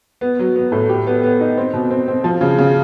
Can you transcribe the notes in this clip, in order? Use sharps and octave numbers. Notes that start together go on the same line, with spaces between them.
B3
F#3
B3
A2
G4
B3
B3
D#4
C4
B2
C4
C4
F3
C#3
C#3